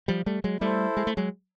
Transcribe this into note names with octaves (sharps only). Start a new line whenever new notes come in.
F3 G3
G3 A3
F#3 G#3
G3 A3 E4 A4 C5
G#3
A3
F#3 G#3